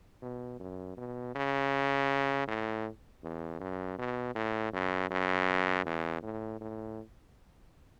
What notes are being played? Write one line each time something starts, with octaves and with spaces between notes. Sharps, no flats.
B2
F#2
B2
C#3
A2
E2
F#2
B2
A2
F#2
F#2
E2
A2
A2